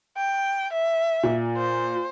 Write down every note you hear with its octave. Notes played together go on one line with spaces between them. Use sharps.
G5
E5
A#2
C5